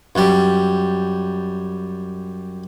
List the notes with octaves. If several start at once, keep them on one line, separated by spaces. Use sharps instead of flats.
F#2 G3